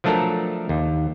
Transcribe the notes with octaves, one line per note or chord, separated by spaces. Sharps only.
F3 F#3 A3 D4 A4 A#4
D#2